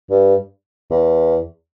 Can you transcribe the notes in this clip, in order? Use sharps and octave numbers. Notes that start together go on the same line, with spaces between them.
G2
E2